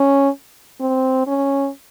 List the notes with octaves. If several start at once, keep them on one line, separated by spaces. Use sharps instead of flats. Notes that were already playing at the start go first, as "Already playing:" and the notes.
Already playing: C#4
C4
C#4